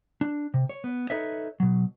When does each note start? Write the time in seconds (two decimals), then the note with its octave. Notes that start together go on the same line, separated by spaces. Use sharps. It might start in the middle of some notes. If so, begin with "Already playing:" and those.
0.21 D4
0.54 C3
0.69 C#5
0.84 B3
1.10 D#4 A4 B4 C#5 D#5 E5
1.60 B2 F#3